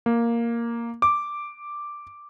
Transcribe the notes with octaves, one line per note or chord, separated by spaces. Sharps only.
A#3
D6